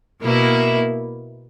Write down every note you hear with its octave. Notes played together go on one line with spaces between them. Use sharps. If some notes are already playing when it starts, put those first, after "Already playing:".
B2 A#3 E4